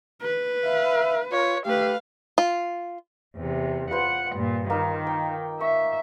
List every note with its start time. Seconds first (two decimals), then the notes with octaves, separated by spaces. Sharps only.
0.22 B4
0.66 E5 F5
1.32 F4 C#5
1.66 A3 G4 B4 F5
2.38 F4
3.37 E2 C3
3.91 F4 B4 C5 F#5
4.33 G2 A#2
4.70 D#3 A#3 D#4
5.07 G5
5.61 E5 C#6